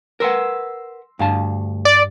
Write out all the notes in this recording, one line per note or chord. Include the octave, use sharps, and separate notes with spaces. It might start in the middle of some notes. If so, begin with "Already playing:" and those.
A#4 B4 F#5 C6 E6 A#6
D2 G2 F5 A5
D5